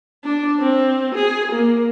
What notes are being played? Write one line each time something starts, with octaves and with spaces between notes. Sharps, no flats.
D4
C4
G#4
A#3